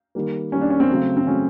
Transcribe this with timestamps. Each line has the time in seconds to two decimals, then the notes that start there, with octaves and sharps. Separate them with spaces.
0.15 D#3 G3 A#3
0.52 D#3 G3 A#3 C#4
0.61 D4
0.70 C#4
0.80 C4
0.89 C#3 F#3 A3
1.17 C4
1.26 C#3 F#3 A3 C#4